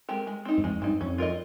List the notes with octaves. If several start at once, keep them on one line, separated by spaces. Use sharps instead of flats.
G#3 C4 G4 A#4
G#3
C4 D#4
G2
F2 G#3
G2 C4 D#4
F2 C#4
F4 A#4 D#5